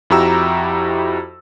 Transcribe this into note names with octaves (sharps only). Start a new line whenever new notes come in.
F2 E4 F#4 G4 A#5 E6